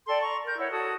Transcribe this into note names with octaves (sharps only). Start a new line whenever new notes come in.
A4 D5 G5 C6
A#5 C#6
A#4 G6
E4 C#5 F#5
F#4 A4 D#6